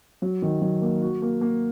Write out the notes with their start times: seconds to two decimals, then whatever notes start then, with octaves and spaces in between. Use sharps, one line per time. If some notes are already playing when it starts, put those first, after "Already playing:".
0.22 F#3
0.42 D#3
0.61 F#3
0.82 A#3
1.02 F#4
1.22 A#3
1.41 A#3